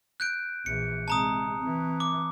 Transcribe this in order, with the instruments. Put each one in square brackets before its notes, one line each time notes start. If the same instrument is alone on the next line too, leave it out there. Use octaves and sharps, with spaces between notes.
[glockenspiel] F#6 G6 D7
[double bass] A#1 E3 [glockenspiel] C#7
[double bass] C3 G#3 [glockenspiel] A5 A#5 D#6
[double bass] E3 C4
[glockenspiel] D6